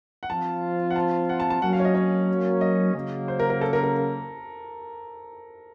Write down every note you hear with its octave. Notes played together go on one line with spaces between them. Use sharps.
F#5
F3 C4 F4 A5
F#5
A5
F#5
A5
A5
F#3 A#3 C#4 F#5
F5
C#5
D#5
C#5
D#5
C#3 F#3 A#3
C5
A#4
A#4
A4
A#4
A#4